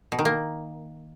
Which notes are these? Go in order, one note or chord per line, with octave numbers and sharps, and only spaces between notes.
B2
D#3
A#3